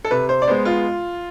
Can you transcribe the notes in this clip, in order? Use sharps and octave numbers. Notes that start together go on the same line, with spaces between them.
A4
C3 B4
C5
D5
G#3 B3 C5
F4